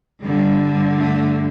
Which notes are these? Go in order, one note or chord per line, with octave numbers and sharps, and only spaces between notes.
G2 D3 G3
A3